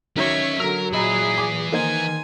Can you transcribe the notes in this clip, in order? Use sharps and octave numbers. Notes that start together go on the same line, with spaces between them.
D#3 F#3 C#4 C#5 D#5 E5
D3 F#3 A#4 E6
A#2 E3 G#4 D#5 A#5 B5
G#5 D6
D#3 A#3 D#4 C5 G#5